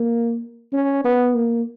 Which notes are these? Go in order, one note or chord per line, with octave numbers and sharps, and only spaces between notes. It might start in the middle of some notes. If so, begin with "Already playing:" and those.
Already playing: A#3
C#4
B3
A#3